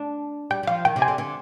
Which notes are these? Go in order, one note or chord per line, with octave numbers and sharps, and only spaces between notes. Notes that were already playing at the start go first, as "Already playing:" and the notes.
Already playing: D4
G3 G5
G3
F3 F5
D#3 G5
C3
G#5
D3
D3